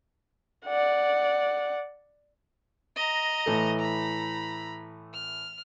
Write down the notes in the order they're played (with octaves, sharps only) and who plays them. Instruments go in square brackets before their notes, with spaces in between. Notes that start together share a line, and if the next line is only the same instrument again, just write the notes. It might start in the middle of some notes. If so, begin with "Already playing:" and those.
[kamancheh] D5 F#5
[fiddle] D#5 A#5
[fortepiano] A2 E3 A3
[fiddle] A#5 B5
F6